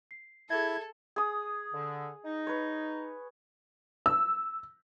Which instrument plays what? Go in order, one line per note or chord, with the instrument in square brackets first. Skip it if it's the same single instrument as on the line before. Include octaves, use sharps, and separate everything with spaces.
[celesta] C7
[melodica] E4 [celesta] G#4 E5 [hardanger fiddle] A4 [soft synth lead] G#6
[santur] G#4 D#6
[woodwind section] D3
D#4
[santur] B4 C#5
[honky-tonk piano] E6